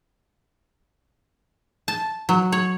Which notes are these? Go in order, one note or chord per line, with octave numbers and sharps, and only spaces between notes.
A5
F#3
C#5